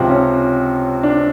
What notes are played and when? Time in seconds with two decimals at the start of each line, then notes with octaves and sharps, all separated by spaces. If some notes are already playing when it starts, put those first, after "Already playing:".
Already playing: C#2 C3 F3 C4
0.09 C#4
1.03 D4